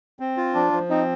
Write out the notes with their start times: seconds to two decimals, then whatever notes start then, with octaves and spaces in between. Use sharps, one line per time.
0.20 C4
0.37 F4
0.54 F3 D4
0.72 F3
0.90 C4 D#4